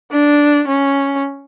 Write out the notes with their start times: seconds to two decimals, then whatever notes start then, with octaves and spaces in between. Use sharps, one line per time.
0.11 D4
0.68 C#4